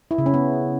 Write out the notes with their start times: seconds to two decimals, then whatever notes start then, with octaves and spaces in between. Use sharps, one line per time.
0.11 E4
0.18 C#3
0.26 C#4
0.34 B3